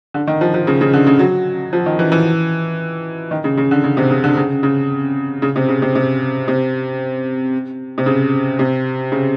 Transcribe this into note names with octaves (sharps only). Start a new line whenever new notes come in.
D3
D#3
F3
F3
C#3
C#3
D3
C#3
F#3
F3
D#3
E3
E3
D#3
C#3
C#3
D3
C#3
C3
C#3
D3
C#3
C#3
C#3
C3
C#3
C3
C3
C3
C3
C#3
C3
C#3